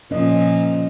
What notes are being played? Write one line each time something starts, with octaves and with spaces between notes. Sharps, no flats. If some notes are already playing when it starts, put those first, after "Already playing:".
A#2 F3 C#4 D#5